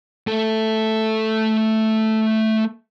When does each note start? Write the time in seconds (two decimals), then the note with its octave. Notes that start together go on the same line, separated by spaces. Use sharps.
0.27 A3 A4